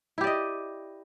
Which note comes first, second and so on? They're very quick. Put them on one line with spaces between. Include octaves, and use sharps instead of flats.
E4 G4 D5 D#5